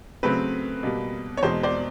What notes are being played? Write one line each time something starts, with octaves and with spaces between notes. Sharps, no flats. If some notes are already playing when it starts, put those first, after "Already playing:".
C#3 F#3 A3 C4 B4
B2 G3 A#3
C#5
E2 B2 G#3 C5
C5 D5